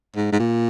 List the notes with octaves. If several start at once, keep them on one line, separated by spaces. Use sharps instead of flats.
G#2
G#2
A#2